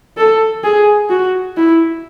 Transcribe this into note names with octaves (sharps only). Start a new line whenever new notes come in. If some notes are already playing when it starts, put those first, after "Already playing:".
A4
G#4
F#4
E4